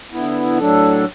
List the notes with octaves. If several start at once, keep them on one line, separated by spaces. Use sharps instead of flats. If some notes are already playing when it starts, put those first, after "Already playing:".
D3 B3 E4
A2 F#3 D4 A4